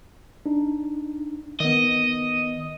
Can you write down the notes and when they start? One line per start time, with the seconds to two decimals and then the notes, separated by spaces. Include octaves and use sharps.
0.46 D4 D#4
1.60 D#3 B3 D#5